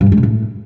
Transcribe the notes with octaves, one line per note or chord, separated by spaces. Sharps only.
G2
F2
G#3
C3
A2